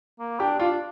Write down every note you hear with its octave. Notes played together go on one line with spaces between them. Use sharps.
A#3
D4 G4
D4 F4